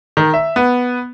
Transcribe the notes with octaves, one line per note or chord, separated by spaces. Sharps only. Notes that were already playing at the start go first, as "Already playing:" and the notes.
D#3
E5
B3